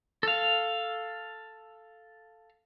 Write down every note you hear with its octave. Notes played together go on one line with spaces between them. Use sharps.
A4 F5